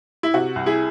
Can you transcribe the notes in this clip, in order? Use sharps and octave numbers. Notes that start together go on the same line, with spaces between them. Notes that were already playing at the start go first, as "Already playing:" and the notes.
E4
C3 F#4
C2
E4 G#4